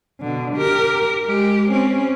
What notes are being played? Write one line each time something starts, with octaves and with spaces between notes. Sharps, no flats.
B2 D3
G4 A#4
G#3 G4
C4 C#4